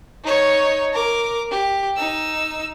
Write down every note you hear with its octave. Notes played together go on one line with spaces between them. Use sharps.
D#4 C#5
A#4 D6
G4
D#4 E6